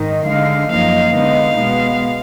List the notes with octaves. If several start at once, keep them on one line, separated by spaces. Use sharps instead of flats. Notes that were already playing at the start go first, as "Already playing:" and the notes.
Already playing: G#2 D#3 D#4
D3 G#3 D#4 F5
F#2 F3 A#3 D#4 F5
D3 G#3 B3 D#4 F5
B2 G#3 B3